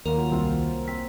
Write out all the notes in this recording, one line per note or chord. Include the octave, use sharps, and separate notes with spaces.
D#2 F#3 A#3 F4 A#4
C2 C4 F4
C4 B6